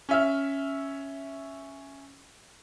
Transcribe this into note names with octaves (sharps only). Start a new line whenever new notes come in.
C#4 E5 F6